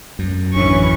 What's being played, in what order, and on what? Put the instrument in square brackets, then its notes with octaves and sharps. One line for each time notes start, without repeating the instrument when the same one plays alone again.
[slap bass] F#2
[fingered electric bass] D#1 A1 D4 [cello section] E3 C#4 B4 [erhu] C#6